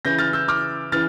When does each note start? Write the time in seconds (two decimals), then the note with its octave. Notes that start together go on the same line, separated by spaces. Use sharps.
0.05 C#3 E3 G6 A#6
0.18 F6 A6
0.33 E6 G6
0.48 D6 F6
0.92 C#3 E3 F6 A6